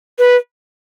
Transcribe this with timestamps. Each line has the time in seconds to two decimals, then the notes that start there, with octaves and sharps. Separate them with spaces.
0.19 B4